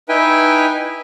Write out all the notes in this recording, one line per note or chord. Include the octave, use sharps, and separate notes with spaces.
D#4 E4 B4 E5 G5 G#5